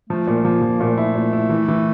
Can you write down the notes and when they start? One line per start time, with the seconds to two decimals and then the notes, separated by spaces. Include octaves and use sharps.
0.09 F3 A3
0.27 A#2
0.45 F3 A#3
0.62 F3
0.80 A#2 A3
0.98 E4
1.15 A#2
1.33 E4
1.50 E3
1.68 E3